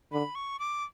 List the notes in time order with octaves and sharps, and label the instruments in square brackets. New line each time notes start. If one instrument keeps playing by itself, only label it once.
[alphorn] D3 [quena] B5
[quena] C#6
D6